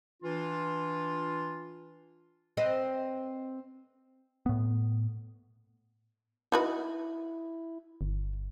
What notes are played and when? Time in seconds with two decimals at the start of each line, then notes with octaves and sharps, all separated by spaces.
0.23 E3 D4 F4
2.57 C4 B4 D#5
4.46 A2 B3
6.52 D#4 E4 F#4 B4
8.01 G1